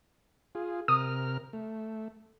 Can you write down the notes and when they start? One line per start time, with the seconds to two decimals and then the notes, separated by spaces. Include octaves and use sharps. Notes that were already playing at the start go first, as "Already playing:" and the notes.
0.55 F4 G#4
0.88 C3 A#4 D#6 F6
1.53 A3